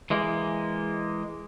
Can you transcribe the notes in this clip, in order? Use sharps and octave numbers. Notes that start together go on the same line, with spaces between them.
E3 G#3 A#3